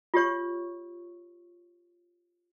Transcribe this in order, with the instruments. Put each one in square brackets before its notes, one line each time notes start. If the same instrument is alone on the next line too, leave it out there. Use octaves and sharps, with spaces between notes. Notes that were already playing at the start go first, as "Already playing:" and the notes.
[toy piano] F4 G4 C#5 C#6